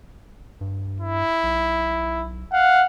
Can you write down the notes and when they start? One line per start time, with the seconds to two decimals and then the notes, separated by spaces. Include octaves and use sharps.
0.61 G2
1.00 E4
1.43 B1
2.53 F5 F#5